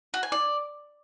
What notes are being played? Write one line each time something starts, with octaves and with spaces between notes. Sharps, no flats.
F#4
G#5
D5